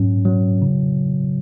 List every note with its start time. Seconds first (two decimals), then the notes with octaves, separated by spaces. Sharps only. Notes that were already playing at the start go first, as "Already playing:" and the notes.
Already playing: G#2 F#3 C#4
0.25 F#3
0.62 C#3